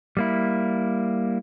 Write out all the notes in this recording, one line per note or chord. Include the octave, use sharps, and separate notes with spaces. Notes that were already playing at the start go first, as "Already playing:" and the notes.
G3 A#3 E4